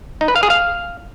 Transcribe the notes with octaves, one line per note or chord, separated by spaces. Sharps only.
D#4
B4
F5
G#4
F5